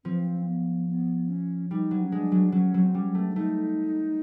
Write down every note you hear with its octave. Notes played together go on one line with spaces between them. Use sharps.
F3 C4
B3
B3
C#4
G3 D#4
F#3
C#4
G#3 D4
F#3
F#3 C#4
F#3
C4
G3 C#4
A3
D4
A3 D#4